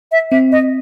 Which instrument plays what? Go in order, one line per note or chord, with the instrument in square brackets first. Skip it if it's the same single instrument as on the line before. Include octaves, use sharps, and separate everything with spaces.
[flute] E5
[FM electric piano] C4 [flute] E5
[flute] D#5